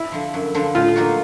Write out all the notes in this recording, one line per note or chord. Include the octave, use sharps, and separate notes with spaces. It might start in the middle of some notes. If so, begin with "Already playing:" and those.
Already playing: E4
D3 F3
F#2
D3 F3
A2 F4
F#3 A#3 D#4 F#4